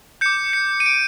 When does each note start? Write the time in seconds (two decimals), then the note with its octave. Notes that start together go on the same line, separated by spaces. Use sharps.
0.21 D6 G6 C#7
0.53 C#7
0.80 D#7
0.86 D7